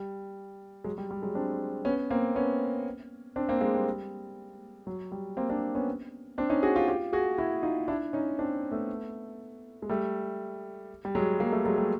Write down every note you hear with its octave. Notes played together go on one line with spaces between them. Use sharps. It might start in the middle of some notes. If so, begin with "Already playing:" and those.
Already playing: G3
F#3 G#3
G3
G3
F#3 G#3
C4 D4
B3 C#4
A#3 C4
B3 C#4
C4 D4
A#3 C4
G#3 A#3
G3
F#3
G3
A#3 C4
C4 D4
B3 C#4
C4 D4
C#4 D#4
F#4 G#4
F4 G4
F4 G4
F#4 G#4
E4 F#4
D#4 F4
D4 E4
C#4 D#4
C4 D4
A3 B3
G#3
G3 A3
G3
F#3 G#3
G#3 A#3
G3 A3
F#3 G#3
G3 A3